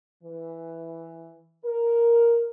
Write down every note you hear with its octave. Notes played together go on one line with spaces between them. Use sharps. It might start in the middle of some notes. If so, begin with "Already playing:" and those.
E3
A#4